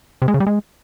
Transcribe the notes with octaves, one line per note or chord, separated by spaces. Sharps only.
C3
G#3
C#3
G3
G#3